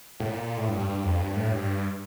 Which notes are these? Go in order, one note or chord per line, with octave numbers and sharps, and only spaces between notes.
A2
A#2
A2
G2
G2
G2
F2
G2
A2
G2